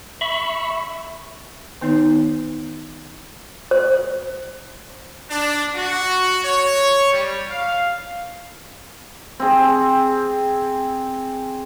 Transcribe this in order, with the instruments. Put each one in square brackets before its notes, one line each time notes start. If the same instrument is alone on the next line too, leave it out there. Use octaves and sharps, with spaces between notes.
[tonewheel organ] E5 B5 C#6
[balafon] D#3 B3 D#4 C#5
[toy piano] C5
[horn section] D4
F#4
C#5
G3
F5
[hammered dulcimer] C4 G#4